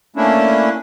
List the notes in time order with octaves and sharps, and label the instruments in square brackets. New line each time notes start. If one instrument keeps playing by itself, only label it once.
[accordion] A3 A#3 C#4 D4 E4